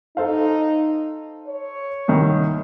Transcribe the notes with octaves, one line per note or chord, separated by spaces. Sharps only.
D#4 A4 C5 F5
C#5
C2 D#3